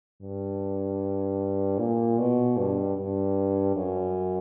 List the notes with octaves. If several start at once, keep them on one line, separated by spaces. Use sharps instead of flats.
G2
A#2
B2
G2
G2
F#2